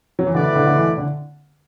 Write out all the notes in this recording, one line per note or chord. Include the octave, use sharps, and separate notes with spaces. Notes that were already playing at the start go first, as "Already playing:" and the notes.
F#3
E3
B2 D3 A3 E4 B4 D5
D3
D3
E3
D3